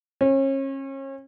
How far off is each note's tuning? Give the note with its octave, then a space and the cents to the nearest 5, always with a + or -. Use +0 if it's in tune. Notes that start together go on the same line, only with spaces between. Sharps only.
C#4 -35